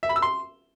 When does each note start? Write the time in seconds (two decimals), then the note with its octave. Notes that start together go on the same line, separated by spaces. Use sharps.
0.03 E5
0.09 B5
0.16 E6
0.22 C6